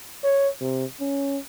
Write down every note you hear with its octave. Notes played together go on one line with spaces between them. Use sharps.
C#5
C3
C#4